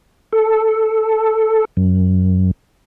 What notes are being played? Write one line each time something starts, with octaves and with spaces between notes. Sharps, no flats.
A4
F#2